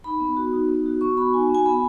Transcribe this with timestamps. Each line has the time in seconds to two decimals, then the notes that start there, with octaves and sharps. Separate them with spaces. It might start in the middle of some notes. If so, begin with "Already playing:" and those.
0.04 D#4 B5
0.20 B3
0.37 F#4
0.53 D#4
0.69 B3
0.86 F#4
1.01 B3 C#6
1.17 F#4 B5
1.34 D#4 G#5
1.50 B3 G#5
1.65 B3 B5